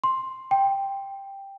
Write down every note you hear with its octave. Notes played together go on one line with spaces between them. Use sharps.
C6
G5